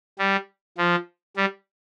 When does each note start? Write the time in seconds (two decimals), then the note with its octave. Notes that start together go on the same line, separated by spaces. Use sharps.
0.19 G3
0.78 F3
1.37 G3